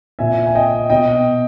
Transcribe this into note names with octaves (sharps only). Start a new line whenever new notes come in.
A#2 E5 G#5
G#5
D#5 G5
B2 D#5 G5